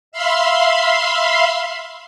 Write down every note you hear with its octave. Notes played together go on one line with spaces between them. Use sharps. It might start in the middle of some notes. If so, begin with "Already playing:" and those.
E5 F5 B5 C6